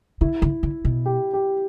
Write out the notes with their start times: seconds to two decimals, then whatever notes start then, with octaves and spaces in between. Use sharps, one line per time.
0.21 D3 E4
0.42 D3
0.63 D3
0.85 B2
1.06 G4
1.33 G4